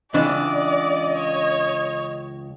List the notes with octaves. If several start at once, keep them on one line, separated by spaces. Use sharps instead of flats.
C#2 E3 D4 D5 D#5
C#5